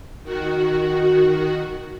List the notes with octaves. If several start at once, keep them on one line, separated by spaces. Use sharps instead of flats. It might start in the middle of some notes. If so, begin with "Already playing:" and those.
D#3 F#4